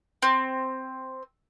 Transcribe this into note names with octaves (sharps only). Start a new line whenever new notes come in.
C4